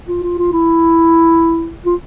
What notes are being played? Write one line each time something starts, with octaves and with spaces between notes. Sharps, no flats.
F4
F4
F4
E4
F4